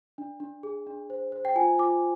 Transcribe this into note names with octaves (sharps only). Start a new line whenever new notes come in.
D4
D4
G#4
D4
C5
C5
G5
F4 G#5
F4 D6